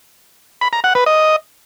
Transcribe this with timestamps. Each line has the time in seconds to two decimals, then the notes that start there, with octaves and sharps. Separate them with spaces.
0.61 B5
0.73 A#5
0.84 F#5
0.95 B4
1.06 D#5